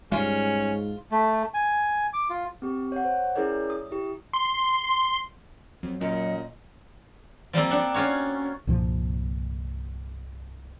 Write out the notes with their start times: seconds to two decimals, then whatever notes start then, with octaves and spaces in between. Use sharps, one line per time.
0.12 G#2 G3 C#4 F4
1.11 A3
1.54 G#5
2.13 D6
2.30 F4
2.62 C4 G4
2.92 C#5 F#5
3.05 C5
3.35 C#4 E4 G#4 A#4 C#5 D5
3.70 D#6
3.91 E4 G4
4.33 C6
5.83 F2 F#3
6.01 F#2 A#2 D#5 C#7
7.53 F3 G3 A#3 C4
7.71 D4 F#5
7.94 C#4 F4 F#4 C#5
8.67 C2 G2 A#2 F3